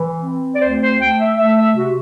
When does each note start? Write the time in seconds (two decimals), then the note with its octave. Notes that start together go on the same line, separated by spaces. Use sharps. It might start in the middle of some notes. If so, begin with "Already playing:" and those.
Already playing: E3
0.22 C4
0.55 D5
0.60 D2 C5
0.80 C5
0.99 A3 G5
1.18 E5
1.37 A3 E5
1.57 E5
1.75 C3 F#4